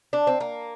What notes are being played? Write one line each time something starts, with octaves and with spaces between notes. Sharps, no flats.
D4
C4
A#3